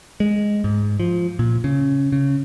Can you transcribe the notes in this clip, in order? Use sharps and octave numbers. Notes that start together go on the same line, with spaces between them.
G#3
G#2
F3
A#2
C#3
C#3